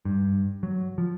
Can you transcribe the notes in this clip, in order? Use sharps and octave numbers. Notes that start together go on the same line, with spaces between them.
G2
F#3
F3